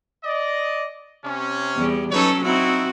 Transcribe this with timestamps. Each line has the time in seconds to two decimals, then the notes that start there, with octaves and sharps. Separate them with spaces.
0.24 D5 D#5
1.24 C3 C#4
1.76 E2 G3
2.11 F#3 C#4 D#4 A4 B4 C#5
2.44 C4 D#4 E4 F#4